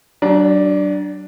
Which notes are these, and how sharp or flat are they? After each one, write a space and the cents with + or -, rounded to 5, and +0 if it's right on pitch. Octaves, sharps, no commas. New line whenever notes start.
F#3 +40 D4 +0